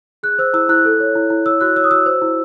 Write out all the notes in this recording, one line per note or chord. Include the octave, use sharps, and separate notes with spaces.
G#4 F#6
C5 E6
E4 E6
E4 F#6
A4
C#5
E4
E4
C#5 E6
F#4 F#6
C#5 E6
D#6
F#4 E6
C5
E4